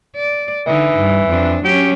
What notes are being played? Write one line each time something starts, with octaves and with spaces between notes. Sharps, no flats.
D5
D3 E3 D#4
G2
F2 D4
F#3 C#4 G4